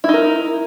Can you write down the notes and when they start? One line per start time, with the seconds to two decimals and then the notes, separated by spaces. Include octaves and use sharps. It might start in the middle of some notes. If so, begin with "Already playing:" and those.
0.04 E4
0.09 D#4
0.14 A#4